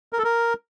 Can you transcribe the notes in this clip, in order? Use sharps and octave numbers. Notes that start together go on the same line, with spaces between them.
A#4
A4
A#4